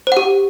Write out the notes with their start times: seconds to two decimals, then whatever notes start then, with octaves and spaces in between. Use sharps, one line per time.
0.07 C5
0.12 F#5
0.17 G4